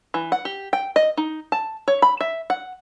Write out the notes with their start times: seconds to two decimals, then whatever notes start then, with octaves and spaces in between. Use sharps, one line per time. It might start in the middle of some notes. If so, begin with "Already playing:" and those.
0.14 E3
0.32 F#5
0.45 G4
0.73 G5
0.96 D#5
1.17 D#4
1.52 A5
1.88 C#5
2.02 B5
2.21 E5
2.50 F#5